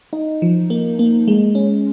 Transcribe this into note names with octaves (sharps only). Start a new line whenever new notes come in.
D#4
F3
A#3
A#3
G#3
C#4